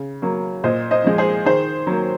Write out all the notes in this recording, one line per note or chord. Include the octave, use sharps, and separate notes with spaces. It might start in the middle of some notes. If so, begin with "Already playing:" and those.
Already playing: C#3
F#3 A#3
A#2 C5 D#5
C5 D#5
F3 G#3
G#4 C5
D#3 G#4 C5
F#3 A#3